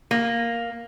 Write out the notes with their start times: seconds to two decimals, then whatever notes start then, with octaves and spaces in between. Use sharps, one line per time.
0.11 A#3